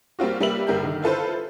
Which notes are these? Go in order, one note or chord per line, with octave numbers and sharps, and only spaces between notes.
G3 A#3 C4 F4 F#4
G3 A#3 B4 E5 F#7
G1 G3 A#4 E5 G6
D3 D#3
E4 F4 A4 B4 C5